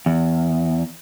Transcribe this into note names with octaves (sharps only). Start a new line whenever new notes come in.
E2